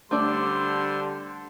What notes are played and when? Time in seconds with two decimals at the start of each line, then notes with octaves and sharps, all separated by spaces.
0.11 D3 G3 A3 D4 A4 C5 D5 C6